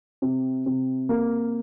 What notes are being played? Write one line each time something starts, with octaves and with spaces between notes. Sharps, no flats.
C3
C3
A#3